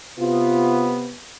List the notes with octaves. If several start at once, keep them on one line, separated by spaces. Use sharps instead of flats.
C3 B3 F4